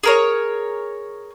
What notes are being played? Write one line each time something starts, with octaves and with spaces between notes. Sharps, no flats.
G#4 A#4 C#5